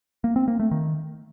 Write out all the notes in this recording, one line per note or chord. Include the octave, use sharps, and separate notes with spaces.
A#3
C4
A#3
A3
D#3